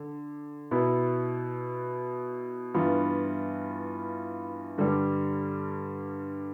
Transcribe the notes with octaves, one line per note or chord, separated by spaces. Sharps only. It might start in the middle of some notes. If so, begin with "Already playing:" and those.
Already playing: D3
B2 B3 E4
G2 E3 B3 F4
G2 D3 G3